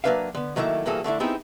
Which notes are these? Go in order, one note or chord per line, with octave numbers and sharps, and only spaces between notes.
F#3 A#3 D4 B4 E5 F5
D3 B3
D#3 F#3 A3 A#3 E4
G2 E3 F#3 A#3 G#4 A4
D3 A3 D4 E4
B3 C4 D#4 E4 G4 G#4